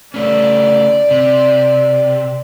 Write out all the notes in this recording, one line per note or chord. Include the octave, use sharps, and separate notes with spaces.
C#3 A3 C#4 D5
C3